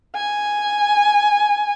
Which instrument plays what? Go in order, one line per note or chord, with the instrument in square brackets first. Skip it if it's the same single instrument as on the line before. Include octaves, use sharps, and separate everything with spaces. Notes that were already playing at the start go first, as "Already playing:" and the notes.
[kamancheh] G#5